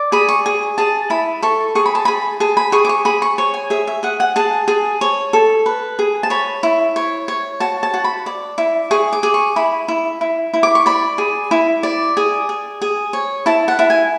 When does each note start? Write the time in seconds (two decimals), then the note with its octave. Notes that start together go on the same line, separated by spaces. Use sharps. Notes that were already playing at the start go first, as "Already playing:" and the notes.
Already playing: D5
0.12 G#4 B5
0.29 C#6
0.46 G#4
0.78 G#4 A5
1.10 E4 B5
1.42 A4 C#6
1.75 G#4 C#6
1.86 B5
1.95 A5
2.05 G#4 B5
2.40 G#4 A5
2.57 B5
2.72 G#4 C#6
2.85 D6
2.89 C#6
3.05 G#4 B5
3.22 C#6
3.38 C#5 C#6
3.54 G#5
3.70 G#4 E5
3.87 E5
4.03 G#4 F#5
4.20 F#5
4.36 G#4 A5
4.68 G#4
5.01 C#5
5.33 A4
5.66 B4
5.99 G#4
6.23 A5
6.30 C#5 B5
6.63 E4
6.96 C#5
7.28 C#5
7.60 F#4 A5
7.83 A5
7.94 F#4
8.04 B5
8.26 D5
8.58 E4
8.91 G#4 C#6
9.13 D6
9.23 G#4
9.34 C#6
9.56 E4 B5
9.88 E4
10.21 E4
10.54 E4
10.63 D6
10.75 C#6
10.86 D5 B5
11.18 G#4
11.51 E4
11.83 D5
12.17 G#4
12.49 G#4
12.82 G#4
13.13 C#5
13.46 E4 A5
13.68 F#5
13.79 E4
13.90 G#5